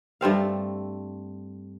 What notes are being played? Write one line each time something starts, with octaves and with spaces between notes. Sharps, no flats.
G2 A3 C4 F5